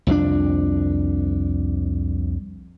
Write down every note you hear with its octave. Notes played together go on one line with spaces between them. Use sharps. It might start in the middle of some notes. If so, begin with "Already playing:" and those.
C2 F2 G3 D4